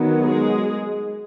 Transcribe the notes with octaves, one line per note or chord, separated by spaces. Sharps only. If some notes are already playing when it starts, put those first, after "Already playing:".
Already playing: D#3 F#3 B3
G#3 G#4